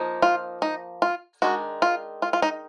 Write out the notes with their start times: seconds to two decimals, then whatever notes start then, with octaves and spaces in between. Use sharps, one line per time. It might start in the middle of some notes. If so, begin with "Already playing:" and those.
Already playing: F3 A#3 D#4
0.22 F4
0.62 D#4
1.02 F4
1.42 D#3 G#3 D4 F#4
1.82 F4
2.22 F4
2.33 F4
2.42 D#4